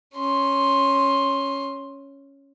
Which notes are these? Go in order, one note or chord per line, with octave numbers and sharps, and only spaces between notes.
C#4 C6